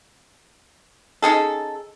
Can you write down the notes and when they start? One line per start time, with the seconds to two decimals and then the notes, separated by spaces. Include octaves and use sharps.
1.22 C#4 D#4 G#4 A4